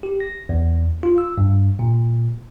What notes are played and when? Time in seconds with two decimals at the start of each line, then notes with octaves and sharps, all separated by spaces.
0.03 G4
0.20 A#6
0.49 E2
1.03 F4
1.18 E6
1.38 G2
1.79 A#2